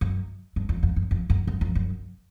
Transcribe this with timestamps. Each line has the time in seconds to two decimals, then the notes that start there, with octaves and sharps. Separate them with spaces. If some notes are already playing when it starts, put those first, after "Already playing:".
0.01 F#2
0.56 G2
0.69 F2
0.83 F2
0.96 F#2
1.11 F2
1.30 F#2
1.47 F#2
1.61 F2
1.75 F#2